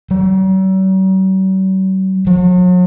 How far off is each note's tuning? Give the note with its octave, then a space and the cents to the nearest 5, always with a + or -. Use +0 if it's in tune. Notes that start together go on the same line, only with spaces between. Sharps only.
F#3 +45
F#3 -40